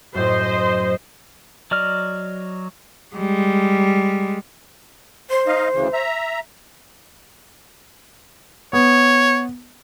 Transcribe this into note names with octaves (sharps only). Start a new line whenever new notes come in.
F#2 A2 C5 D#5
F#3 D5 D#5 F6
G3 G#3
C5 C6
D#4 D#5 F5
D2 C#3 E3
E5 A#5
B3 C#5